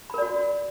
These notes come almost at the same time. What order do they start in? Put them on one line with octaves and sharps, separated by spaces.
B5 A#4 D5 F#4